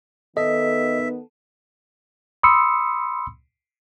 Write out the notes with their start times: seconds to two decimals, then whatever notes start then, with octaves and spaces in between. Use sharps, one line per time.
0.37 D#3 B3 A4 D#5 E5
2.43 B5 C6 D#6 E6 C#7